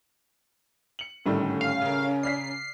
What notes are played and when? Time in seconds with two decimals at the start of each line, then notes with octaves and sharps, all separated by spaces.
0.99 C#7 F#7
1.26 G#1 A2 D3 D#3 G3 A3 C#4
1.61 F5
1.81 C#3 A#4
2.23 D5 F6 B6 C7